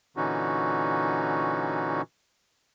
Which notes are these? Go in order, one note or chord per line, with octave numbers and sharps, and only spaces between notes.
A#2 D3 E3 C#4 D#4 F#4